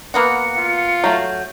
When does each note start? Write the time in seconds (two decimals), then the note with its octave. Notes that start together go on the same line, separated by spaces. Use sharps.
0.14 A#3 B3 F#4 C#7
0.58 F4
1.04 F#3 A3 G6